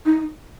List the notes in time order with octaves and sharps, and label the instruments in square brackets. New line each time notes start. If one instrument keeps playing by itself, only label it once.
[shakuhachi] D#4